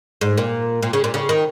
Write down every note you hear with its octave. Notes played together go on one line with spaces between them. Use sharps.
G#2
A#2
A#2
C#3
A#2
C#3
D#3